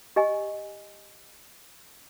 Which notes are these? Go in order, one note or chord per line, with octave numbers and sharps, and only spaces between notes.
G4 D#5 G#5